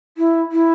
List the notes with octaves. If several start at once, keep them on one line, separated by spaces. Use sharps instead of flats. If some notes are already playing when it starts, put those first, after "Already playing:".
E4
E4